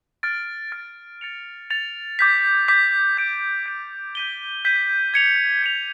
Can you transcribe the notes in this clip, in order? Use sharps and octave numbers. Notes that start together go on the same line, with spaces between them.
F6 A6 D7
F6 A6 D7
A6 C#7 F7
A6 C#7 F7
D6 G6 B6
D6 G6 B6
G6 B6 D7
G6 B6 D7
G6 B6 D#7 G7
G6 B6 D#7 G7
G#6 C#7 F7
G#6 C#7 F7